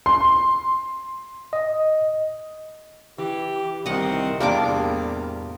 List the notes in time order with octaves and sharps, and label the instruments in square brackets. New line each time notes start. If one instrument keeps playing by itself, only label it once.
[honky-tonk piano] C6
[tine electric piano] D#5
[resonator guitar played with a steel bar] E3 [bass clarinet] G4
[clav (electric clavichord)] C2 D#3 [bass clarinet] C4 [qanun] D#5 F#5
[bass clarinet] E2 [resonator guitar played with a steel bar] A2 C3 A#4 [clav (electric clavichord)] G3 [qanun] A#3 D4 D6